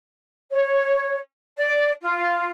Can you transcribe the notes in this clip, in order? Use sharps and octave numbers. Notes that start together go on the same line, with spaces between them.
C#5
D5
F4